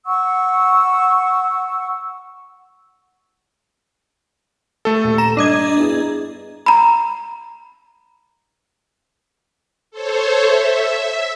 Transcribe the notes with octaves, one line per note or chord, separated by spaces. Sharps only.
F#5 C#6 E6
A3 A4
D#1
A#5 E7
G2 D4 D#5 G#6
B3 E4 G#4
A#5 B5
A4 C5 C#5
E5